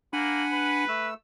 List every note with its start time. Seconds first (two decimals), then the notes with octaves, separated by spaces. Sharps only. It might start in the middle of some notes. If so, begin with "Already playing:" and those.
0.13 A#3 D4 F#5 G#5 B5
0.53 B4
0.89 A3 E6